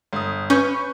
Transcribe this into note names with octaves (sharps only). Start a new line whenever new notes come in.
G1 D#6
C#4 B4 C#6 G6